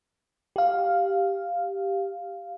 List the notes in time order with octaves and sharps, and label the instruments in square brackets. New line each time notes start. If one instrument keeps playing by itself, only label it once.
[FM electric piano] G4 F5